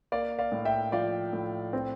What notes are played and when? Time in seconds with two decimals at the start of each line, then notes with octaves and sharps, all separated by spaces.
0.12 A#3 D5 F5
0.39 D5 F5
0.52 A2
0.65 E5 G5
0.92 F3 D5 F5
1.33 A2
1.73 C4